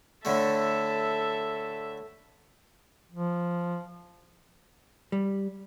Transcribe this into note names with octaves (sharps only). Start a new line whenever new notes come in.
A2 D3 A3 A4 E5
F3
G3